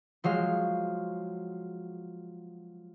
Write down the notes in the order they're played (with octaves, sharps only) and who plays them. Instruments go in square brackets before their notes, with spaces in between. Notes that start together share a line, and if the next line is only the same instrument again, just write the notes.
[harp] F3 F#3 G#3 F5